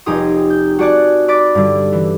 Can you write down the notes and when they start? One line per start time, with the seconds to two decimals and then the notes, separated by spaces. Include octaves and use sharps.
0.06 F1 D#4 G4 G#4 C6 D#6
0.50 G6
0.79 F#4 G#4 D5 A5 F#6
1.28 D5 B5 D6 A6
1.55 G2 D3
1.93 E3